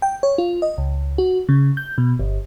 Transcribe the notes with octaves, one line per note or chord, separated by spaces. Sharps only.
G5
C#5
F4
D#5
C#2
F#4
C#3
G6
B2
G1